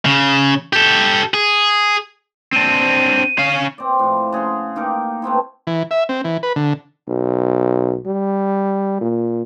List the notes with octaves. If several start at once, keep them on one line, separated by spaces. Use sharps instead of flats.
C#3
G4 A4
G#4
C4 D4 D#7
C#4 F5
C4 D5
A2 F3
C#3 G#4 F#5 C6
A#3 D#4 G4 A#4
A3 B3 C4 E4
E3
E5
C4
E3
B4
D3
B1
G3
A#2